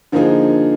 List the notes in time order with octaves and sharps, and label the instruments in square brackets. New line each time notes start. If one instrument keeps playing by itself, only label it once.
[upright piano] D3 F3 A#3 D#4 G#4